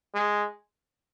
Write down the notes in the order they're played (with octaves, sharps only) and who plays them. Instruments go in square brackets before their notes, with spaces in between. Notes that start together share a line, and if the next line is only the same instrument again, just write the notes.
[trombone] G#3